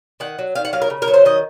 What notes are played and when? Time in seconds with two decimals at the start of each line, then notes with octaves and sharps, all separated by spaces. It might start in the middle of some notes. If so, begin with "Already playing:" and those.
0.20 D#3 F#5
0.39 F#3
0.55 D#3 F5
0.65 F#5
0.73 F#3 F5
0.82 A#4
0.90 C#3
1.02 A#4
1.08 F#3
1.14 C5
1.25 D#3 D#5